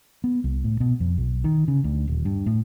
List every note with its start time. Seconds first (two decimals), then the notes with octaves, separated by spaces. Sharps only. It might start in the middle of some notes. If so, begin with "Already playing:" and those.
0.24 B3
0.44 C2
0.64 A2
0.80 B2
1.00 F2
1.18 B1
1.44 D#3
1.68 C#3
1.84 D2
2.07 D#1
2.25 G2
2.46 A2